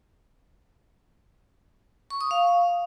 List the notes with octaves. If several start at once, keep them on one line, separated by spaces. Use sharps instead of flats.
C#6
D#6
F5